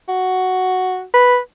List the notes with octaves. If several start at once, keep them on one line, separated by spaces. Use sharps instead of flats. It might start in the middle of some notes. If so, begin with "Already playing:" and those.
F#4
B4